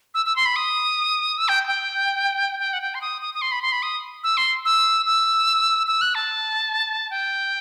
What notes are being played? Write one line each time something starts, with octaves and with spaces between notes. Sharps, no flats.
E6
E6
C6
B5
D#6
E6
G5
G5
G5
F#5
G5
C6
D#6
D#6
D#6
C6
B5
C6
B5
D#6
E6
C6
E6
E6
E6
F#6
A5
G5